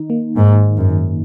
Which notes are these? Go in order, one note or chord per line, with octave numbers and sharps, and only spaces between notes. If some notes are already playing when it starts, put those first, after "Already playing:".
Already playing: D#3 D#4
A#3
G#2 A#3
D#4
F#2
D#3